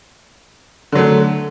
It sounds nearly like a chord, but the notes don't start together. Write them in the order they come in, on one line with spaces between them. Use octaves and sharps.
D3 F#3 A3